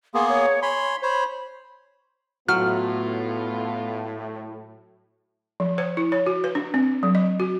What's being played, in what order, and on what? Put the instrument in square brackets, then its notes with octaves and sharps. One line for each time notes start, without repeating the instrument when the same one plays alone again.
[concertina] A#3 B3 G#4 [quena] C6
[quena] C#5
[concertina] C#5 B5 C6 [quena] G#5
[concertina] C5 C#5 [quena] B5
[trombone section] A2 [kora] F#3 [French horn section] B3 F4 [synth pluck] F6
[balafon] F3
C5
E4
C#5
F#4
B4
D4
C4
F#3
D#5
F#4